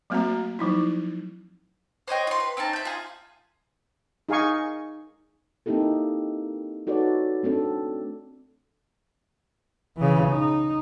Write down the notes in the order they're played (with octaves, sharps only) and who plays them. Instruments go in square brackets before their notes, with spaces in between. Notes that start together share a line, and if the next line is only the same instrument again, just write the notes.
[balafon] F#3 A3 A#3 C4 F#4 A#5
F3 F#3 D#4 E4
[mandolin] C5 C#5 D#5 G5
F4 C6
B4
C4 C#4 D#4 A5
E5 G6
F4 G#4
[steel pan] D#4 G#4 F5 G#5 C#6
[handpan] A#3 C4 D#4 E4 G4 A4
D#4 F#4 A4 B4 C#5 D5
A3 C4 D4 A4
[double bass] C#3 E3
D#4